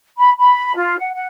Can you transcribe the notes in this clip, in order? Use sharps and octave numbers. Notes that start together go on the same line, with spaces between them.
B5
B5
F4
F#5
F#5